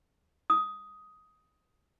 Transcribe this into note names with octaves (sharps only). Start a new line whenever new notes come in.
D#6